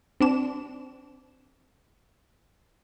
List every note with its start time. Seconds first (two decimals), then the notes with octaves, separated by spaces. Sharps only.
0.20 C4 D4 E7